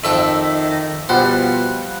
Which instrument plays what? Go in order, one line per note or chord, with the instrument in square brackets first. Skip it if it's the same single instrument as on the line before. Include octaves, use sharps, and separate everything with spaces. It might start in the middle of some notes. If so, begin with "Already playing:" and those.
[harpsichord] F2 A4 G5 [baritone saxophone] D#3 [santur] E5
[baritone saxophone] B2 [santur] F3 G3 F#5 [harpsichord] C5